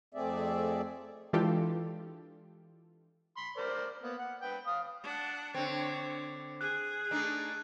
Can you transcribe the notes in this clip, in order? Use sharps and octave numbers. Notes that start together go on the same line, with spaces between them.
F2 A3 C4 G#4 D5 E5
E3 G#3 D4 F4 G4 A4
B5 C6
A#4 C5 D5
A#3 B3
F#5
B4 G5
F5 D#6
D4 F#5
D3 C4 C#5
G#4 F#6
A3 D4 D#4